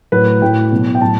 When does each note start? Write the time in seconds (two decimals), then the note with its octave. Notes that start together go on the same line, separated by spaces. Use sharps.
0.12 A2 F#3 B4
0.42 A2 F#3 G5
0.72 B2 F#3
0.95 G5
1.01 A2 F#3 A5